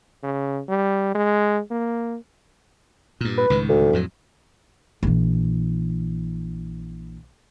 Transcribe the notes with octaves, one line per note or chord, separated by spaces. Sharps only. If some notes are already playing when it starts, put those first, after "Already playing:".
C#3
G3
G#3
A#3
G2 A#2
B4
C#2 A2 D#3
D2
F2 A2 F#3
A#1 E3